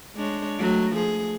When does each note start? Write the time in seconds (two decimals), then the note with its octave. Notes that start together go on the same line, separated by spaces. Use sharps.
0.15 G#3 D4 C#5
0.59 F#3 A3
0.94 F3 G#4